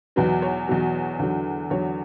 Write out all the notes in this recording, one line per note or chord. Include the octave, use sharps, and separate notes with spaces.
E2 B2 F#3 B4
C#5
E2 B2 F#3
E2 D3 F#3
E2 D3 F#3 C#5